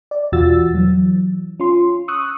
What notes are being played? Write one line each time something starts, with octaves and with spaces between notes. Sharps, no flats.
D5
E2 B2 F4 F#4 E6 A6
E3 F#3
C#4 F4 C6
C#6 D#6 E6 F#6